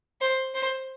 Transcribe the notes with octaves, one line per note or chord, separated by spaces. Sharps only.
C5
C5